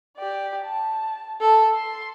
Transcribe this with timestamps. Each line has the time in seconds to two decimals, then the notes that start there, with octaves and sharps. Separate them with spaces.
0.17 G4 D5
0.64 A5
1.41 A4
1.74 C6